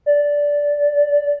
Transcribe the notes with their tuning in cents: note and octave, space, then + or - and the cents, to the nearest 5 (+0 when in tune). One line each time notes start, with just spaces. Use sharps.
D5 -10